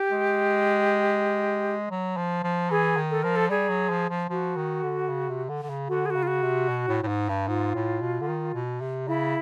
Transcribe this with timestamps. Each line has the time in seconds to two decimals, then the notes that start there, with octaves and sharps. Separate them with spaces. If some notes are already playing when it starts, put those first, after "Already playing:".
Already playing: G4
0.11 G#3
1.90 F#3
2.17 F3
2.43 F3
2.70 E3 G#4
2.97 D#3
3.11 A4
3.22 F3 A#4
3.36 A4
3.50 G3 G#4
3.69 F#3
3.90 F3
4.10 F3
4.29 F3 F#4
4.56 D#3
4.83 D3
5.09 C#3
5.29 C3
5.49 D3
5.63 D3
5.70 C#3
5.89 D3 F#4
6.06 G#4
6.10 F#4
6.16 C#3
6.23 F4
6.27 F#4
6.43 C3
6.69 B2
6.89 A2
7.03 A2
7.08 G#2
7.29 G2
7.48 G#2 F4
7.75 A2
8.01 B2
8.21 D3
8.28 D#3
8.54 B2
8.81 C3
9.08 C#3 E4